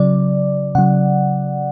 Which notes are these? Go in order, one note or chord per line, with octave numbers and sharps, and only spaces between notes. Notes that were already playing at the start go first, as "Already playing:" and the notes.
Already playing: C#3 F#3 D5
C#3 F#3 F#5